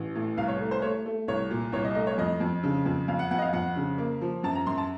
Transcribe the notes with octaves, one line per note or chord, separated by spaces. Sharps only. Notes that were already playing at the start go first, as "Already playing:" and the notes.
Already playing: A1
A2
C2 F5
C#5
A3
C5
A3 C#5
A3
C2 C#5
A#2
C2 C#5
D#5
A3 D#5
C#5
F2 D#5
F2
C#3
F2
F2 F5
F#5
F2 F#5
D#5
F5
F2 F#5
C#3
A#3
F3
F#2 A5
A#5
F#2 C6
A5